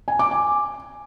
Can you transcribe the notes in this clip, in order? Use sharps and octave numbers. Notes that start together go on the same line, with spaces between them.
G#5
D6
G#5